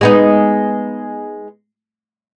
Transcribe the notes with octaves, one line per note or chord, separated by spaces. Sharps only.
G#3 B3 D#4